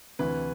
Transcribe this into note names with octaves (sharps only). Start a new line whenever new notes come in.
D2 C3 E3 B4